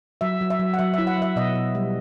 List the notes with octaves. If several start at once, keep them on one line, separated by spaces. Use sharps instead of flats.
F#3 E5
F#3
E5
F#3
F#5
F#3 E5
E4 E5
F#5
F#3 E5
B2 D#5
B2
G3